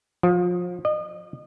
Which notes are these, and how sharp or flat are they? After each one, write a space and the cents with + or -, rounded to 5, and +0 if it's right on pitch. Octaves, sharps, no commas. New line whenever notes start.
F3 +30
D#5 -35